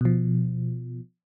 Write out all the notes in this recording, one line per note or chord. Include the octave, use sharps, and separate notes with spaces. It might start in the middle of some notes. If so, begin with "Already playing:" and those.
B2 F3